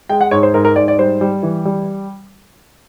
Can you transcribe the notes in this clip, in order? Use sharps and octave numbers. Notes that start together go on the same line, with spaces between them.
G#3 G5
F#5
G#2 C#5
C5
G#2 A#4
A#4
G#2 D5
D5
G3 C5
G3
E3
G3